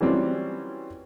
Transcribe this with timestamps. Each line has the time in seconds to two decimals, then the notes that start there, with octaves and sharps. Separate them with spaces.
0.01 E3 F#3 G3 C4 C#4 F4